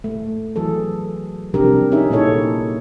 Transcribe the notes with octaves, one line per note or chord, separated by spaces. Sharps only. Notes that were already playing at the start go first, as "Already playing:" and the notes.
A3
E3 F#3 G#4 A4
C3 F3 G3 D4 G4 A#4
C#4 D#4 G4 G#4 E5
A#2 A#3 D#4 E4 A4 C#5